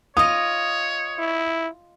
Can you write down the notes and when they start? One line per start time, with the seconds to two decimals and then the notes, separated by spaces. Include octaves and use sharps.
0.17 F4 C#5 D#5 D#6
1.19 E4